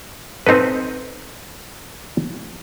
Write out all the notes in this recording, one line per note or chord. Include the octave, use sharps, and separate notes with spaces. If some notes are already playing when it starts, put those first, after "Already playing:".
C4 D#4 A4 B4